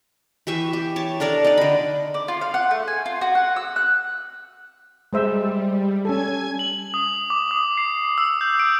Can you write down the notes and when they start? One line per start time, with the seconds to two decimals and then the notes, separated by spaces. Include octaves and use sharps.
0.47 E3 G4 E5 C#6
0.73 G4
0.96 C#5 A5
1.20 D4 A4 A#4 D5
1.44 D#4 D5
1.57 D3 B5
2.14 D5
2.28 F4
2.41 F5
2.54 F#5
2.71 A3
2.88 G#5
3.06 F4
3.21 F#4
3.35 F#5
3.56 E6
3.76 F#6
5.13 G3 G#3 C5 E5
6.05 C#4 A4 G#5 G#6
6.59 F#7
6.94 D#6
7.30 D6
7.51 D#6
7.77 C7
8.18 E6
8.41 G6
8.60 D7